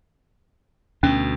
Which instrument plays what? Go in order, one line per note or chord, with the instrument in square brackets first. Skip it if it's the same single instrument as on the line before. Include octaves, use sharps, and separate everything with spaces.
[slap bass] D2 B2 [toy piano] C#4